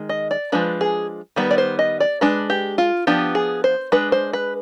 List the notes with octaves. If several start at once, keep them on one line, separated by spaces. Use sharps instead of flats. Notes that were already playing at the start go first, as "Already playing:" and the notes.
Already playing: D#3 G#3
D#5
D5
F3 G#3 D4 B4
G#4
D#3 G3 B3 B4
D5
C5
D#5
D5
G#3 D4 B4
G4
F4
F3 B3 D4 G4
G#4
C5
G#3 D4 B4
C5
B4